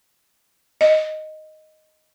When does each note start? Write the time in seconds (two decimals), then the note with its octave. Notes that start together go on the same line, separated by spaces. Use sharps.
0.81 D#5